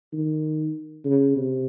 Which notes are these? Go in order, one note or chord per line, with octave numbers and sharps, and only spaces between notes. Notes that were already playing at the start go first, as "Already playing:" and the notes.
D#3
C#3
C3